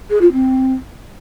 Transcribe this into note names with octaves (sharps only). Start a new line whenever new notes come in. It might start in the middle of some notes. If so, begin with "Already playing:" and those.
G#4
F4
C4